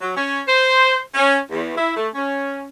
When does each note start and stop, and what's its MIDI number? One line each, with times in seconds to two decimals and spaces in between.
0.01 0.14 54
0.15 0.41 61
0.47 0.99 72
1.15 1.37 61
1.50 1.76 40
1.77 1.94 64
1.96 2.08 57
2.14 2.68 61